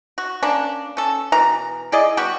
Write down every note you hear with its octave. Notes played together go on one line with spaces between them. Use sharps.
F#4
A#3 C#4 D4
C#4 A4
B2 E3 A#4 A#5
E4 G#4 D5 D#5
G3 B3 F#4 G4